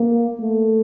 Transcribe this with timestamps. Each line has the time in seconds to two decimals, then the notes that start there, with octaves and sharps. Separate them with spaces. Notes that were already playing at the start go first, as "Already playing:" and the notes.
Already playing: A#3
0.42 A3